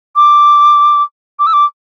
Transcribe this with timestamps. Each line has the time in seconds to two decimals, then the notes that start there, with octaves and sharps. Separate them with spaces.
0.16 D6
1.39 D6
1.47 E6
1.53 D6